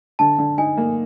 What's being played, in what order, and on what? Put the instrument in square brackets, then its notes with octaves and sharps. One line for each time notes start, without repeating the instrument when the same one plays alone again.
[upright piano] D3 [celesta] A5
[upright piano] D3
[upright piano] D#4 [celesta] G#5
[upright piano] A#3